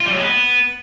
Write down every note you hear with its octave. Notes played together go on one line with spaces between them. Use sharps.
F4
G3
F#3
G#3
B3